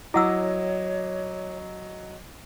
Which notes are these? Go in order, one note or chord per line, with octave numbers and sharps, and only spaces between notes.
F#3 E4 C#5 D#5 F#5 D6 E6